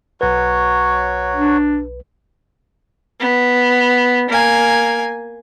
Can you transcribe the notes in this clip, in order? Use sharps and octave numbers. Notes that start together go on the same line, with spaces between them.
B1 F#3 F#4 B4 C#5
D4
B3
A#3 G#5